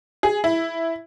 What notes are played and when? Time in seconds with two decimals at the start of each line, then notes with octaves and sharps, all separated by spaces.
0.23 G#4
0.44 E4